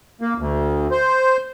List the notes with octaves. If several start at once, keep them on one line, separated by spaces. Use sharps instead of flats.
A#3
D2
C5